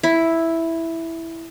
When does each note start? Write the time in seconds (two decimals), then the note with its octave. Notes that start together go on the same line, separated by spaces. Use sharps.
0.03 E4